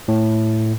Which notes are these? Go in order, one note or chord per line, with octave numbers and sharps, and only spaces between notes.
A2